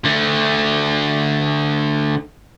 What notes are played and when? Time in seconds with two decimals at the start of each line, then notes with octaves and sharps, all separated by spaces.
0.05 D3 A3